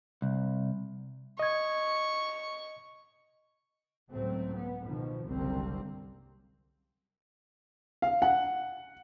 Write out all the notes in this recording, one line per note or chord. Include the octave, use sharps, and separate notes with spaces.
C2
D#5 C#6 G#6
C#2 A2 F#3 A3 C4
B3
B2 D#3 F3
F#1 C2 D3 G3 A#3 C4
F5
F#5